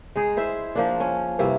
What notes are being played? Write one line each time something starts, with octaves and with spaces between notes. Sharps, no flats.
G#3 D#4 G#4
E4 C5 E5
F3 A#3 D4
C#4
G2 C3 A#3 E4